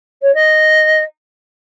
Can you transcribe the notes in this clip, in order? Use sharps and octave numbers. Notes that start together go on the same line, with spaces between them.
C#5
D#5